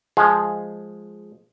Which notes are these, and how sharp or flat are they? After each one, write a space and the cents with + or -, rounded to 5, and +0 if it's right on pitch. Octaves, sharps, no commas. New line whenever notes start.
F3 +0 G#3 +0 G#4 +0